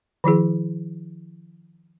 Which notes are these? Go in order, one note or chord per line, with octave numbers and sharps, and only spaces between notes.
D#3 F3 E4 G#4